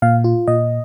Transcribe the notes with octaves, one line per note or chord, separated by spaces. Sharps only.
A#2 F5
F4
A#2 D#5